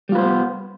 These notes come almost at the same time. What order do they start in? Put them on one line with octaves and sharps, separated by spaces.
G3 F4 B4 C5 B3